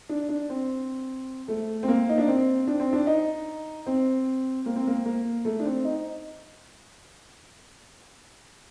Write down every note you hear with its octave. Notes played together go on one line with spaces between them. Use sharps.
D4
D4
C4
A3
C4
A#3
D#4
D4
C4
D4
C4
D4
D#4
C4
A#3
C4
A#3
A#3
A3
D4
C4
D#4